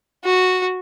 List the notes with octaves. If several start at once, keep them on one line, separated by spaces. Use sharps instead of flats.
F#4